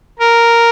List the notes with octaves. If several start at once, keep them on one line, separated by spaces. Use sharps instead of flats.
A#4